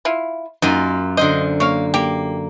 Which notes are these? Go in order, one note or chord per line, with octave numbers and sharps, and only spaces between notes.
E4 F4
F#2 A#3 D#4 F4
D3 A#4 C5 D#5
A#3 C#5 F5
A#3 G4